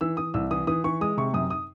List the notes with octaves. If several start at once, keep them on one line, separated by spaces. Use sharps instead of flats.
E3 E6
E3 D#6
C2 E6
E3 D#6
E3 D#6
E3 C#6
G#3 D#6
C3 C#6
F#2 D#6
D#6